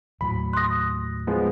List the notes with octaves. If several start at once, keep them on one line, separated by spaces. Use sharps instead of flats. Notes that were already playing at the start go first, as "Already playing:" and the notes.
D#2 A2 F#3 B5
C6 D#6 F#6 A#6
F3 G#3 B3